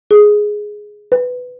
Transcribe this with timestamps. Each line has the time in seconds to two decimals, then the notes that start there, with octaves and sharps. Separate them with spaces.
0.11 G#4
1.12 B4